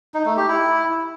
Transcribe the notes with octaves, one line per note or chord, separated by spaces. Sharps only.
D#4
A3
G4
E4